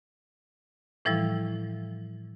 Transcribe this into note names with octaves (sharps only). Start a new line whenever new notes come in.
A2 E3 F3 G3 E4